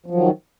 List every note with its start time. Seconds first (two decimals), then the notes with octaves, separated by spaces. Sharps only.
0.06 F3
0.10 F#3
0.15 D#3